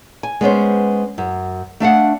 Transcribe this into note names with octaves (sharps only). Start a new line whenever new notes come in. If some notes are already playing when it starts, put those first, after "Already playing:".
G#5
G#3 B3 C#4 C5
F#2
A3 D4 F5 F#5